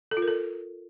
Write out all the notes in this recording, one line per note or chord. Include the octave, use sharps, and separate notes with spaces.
A4
F4
A#4
A4